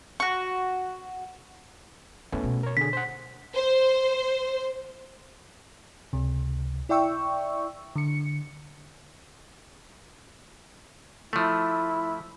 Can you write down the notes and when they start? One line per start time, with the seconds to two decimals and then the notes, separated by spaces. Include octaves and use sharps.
0.20 F#4 C#6
2.32 A3 B3 C#4 E4
2.44 B2
2.63 A#4 C#5
2.77 D3 G#4 B6
2.93 C5 F#5
3.55 C5
6.13 C#2 C3
6.89 E4 D5 E5 G5 C#6 E6
7.96 D3 C#7
11.33 F3 A3 E4